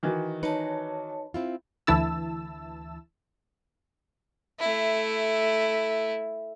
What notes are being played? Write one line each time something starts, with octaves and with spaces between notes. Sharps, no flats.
D#3 E3 F#4
D#4 B4 C#5 A5
C4 E4 F4
D2 E3 E4 A5 E6
A3 E4